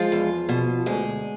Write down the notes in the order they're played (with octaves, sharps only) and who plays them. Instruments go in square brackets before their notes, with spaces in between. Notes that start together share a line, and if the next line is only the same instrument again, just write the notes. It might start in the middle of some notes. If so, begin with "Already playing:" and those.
Already playing: [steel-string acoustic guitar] F3 G#3 F4
E2
B2
D2 G#3 G#4